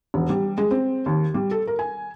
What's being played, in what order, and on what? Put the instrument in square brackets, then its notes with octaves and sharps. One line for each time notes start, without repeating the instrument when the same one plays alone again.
[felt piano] E1
G3
G#3
C4
D#2
G3
A4
A#4
G#5